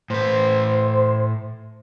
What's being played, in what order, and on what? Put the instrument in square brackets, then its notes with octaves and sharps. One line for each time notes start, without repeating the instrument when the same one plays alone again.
[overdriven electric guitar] A2 B4 [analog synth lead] C5